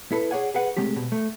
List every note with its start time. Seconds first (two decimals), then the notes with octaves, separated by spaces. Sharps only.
0.12 E4 A4 B4
0.31 G#4 C#5 D5 F#5 G#5
0.54 G#4 B4 F#5
0.77 C3 G#3 A3 C4 G4
0.96 B2
1.12 A3